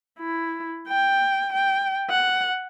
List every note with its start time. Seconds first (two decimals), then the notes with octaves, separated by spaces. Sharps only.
0.20 E4
0.89 G5
1.53 G5
2.10 F#5